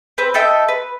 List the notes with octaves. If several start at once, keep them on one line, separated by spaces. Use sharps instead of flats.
C4 B4
D#4 A4 E5 G5
B4